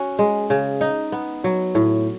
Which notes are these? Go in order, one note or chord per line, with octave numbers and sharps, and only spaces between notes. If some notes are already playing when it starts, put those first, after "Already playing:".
Already playing: C#4 F#4
G#3
C#3
D#4
B3
F#3
A2